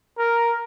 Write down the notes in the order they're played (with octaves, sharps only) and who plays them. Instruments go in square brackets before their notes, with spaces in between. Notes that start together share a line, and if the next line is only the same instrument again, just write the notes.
[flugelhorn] A#4